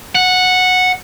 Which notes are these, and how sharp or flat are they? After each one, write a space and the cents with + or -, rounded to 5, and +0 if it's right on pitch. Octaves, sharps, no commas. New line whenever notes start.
F#5 -10